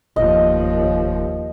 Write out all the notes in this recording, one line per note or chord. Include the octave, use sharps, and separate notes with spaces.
F1 D#2 F3 D#5